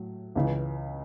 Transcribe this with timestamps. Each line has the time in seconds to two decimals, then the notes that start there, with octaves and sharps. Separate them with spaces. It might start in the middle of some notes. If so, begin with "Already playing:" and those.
Already playing: A2 F#3
0.36 C#2 C#3 E3